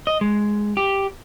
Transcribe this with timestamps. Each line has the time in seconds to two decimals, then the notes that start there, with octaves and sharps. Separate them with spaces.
0.07 D#5
0.21 G#3
0.77 G4